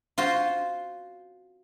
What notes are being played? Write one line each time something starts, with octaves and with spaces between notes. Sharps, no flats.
F4 F#4 C5